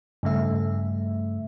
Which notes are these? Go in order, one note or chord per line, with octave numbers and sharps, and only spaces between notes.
G2 C#3 A3 E5